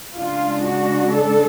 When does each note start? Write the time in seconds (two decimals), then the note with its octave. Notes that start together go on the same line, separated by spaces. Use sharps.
0.18 C#3 G#3 D4 F4
0.66 F#4
1.13 A4